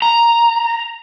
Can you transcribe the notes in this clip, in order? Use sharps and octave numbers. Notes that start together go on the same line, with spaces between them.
A#5